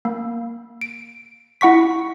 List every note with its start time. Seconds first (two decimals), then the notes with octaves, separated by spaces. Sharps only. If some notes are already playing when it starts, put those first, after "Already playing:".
0.05 A#3
0.81 D7
1.61 E4 F#5 C#6 B6